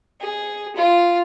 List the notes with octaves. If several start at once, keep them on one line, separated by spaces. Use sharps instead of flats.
G#4
F4